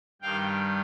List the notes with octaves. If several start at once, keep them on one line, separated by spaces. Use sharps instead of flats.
G2 D#3 G3 F5 G5